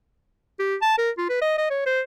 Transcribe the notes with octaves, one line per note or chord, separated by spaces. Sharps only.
G4
A5
A#4
F4
B4
D#5
D#5
C#5
C5